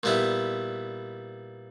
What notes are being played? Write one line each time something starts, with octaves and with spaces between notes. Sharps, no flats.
A#2 G3 B3 E4